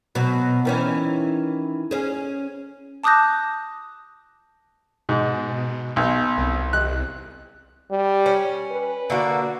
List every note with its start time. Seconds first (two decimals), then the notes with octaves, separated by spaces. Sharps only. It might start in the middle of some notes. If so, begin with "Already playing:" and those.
0.15 B2 F#3
0.65 D#3 E3 C#4
1.91 C#4 G#4
3.04 A5 D6 D#6 F#6 G6 A#6
5.09 G#2 B2
5.96 B1
6.38 C2
6.73 C2 F#6
7.91 G3
8.26 C#4
8.71 B4
9.10 D3 A#3 F#4